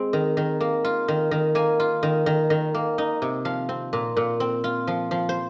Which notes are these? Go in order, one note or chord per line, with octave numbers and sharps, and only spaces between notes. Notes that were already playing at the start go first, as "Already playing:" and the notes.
Already playing: G#3 C4
D#3
D#3
A#3
F4
D#3
D#3
A#3 G#5
F4
D#3
D#3
D#3
A#3
D#4
C3
F3 F5
C4
A#2
A#2
C4
F4
F3
F3
C5